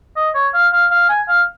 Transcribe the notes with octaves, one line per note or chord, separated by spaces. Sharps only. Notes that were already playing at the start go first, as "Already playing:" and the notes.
D#5
C#5
F5
F5
F5
G#5
F5